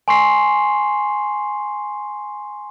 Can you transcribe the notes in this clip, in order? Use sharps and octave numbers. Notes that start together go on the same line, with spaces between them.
G#5 C6 C#6 C7